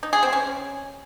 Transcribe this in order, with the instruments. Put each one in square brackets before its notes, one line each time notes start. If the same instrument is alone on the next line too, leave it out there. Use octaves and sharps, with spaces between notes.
[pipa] D#4
G#4
C4
C#4